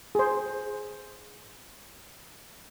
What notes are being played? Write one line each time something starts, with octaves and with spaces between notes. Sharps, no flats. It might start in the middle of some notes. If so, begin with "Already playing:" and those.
G#4 C5